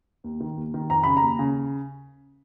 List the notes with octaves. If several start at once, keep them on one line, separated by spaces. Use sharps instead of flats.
D#2
D#3
D#2
D#3
F2 A#5
C#3 B5
A#5
D#2
C#3